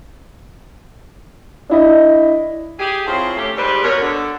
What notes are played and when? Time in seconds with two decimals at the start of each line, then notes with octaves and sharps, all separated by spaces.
1.70 D4 E4 D#5
2.79 G4 G#4
3.06 F3 C4 E4 F4 G#4 C#5
3.37 A3 C#4 G4
3.56 G#2 G3 B4 C5 D5
3.83 B2 A#4 C#5
4.01 D3